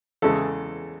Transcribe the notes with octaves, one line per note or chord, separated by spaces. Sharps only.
E2 C#3 E3 G#3 A4